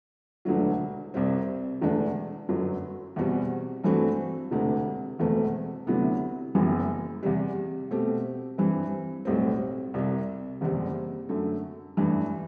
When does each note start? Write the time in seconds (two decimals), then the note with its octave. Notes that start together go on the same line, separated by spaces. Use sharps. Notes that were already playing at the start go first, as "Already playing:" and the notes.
0.45 E1 D2 D3 F#3
1.14 C2 C3 G3 C4
1.81 E1 E2 D3 A3 D4
2.49 G1 F#2 F#3
3.16 E2 B2 G3 C4 F#4
3.84 G2 E3 A3 C4 F#4
4.51 E1 D2 C3
5.19 E1 E2 B2 A3 C4
5.87 D2 C3 F#3 B3 E4
6.55 F#1 F#2 E3 B3
7.23 E2 C3 G3
7.91 B2 A3 C4 G4
8.58 G2 E3 G3 C4
9.25 B1 A2 G3 C4
9.94 C2 C3 G3
10.61 F#1 E2 C3 G3 C4
11.29 F#2 D3 A3
11.97 A1 G2 E3 G3